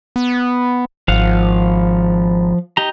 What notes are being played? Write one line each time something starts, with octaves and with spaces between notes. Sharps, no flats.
B3
G#1 F3 F5 F#5
D#4 G4 A#5